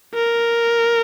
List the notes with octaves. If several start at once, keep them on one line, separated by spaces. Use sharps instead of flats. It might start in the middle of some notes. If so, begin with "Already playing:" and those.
A#4